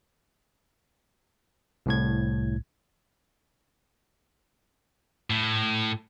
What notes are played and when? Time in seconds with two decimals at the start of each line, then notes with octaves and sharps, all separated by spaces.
1.86 C2 A2 G#6
5.30 A2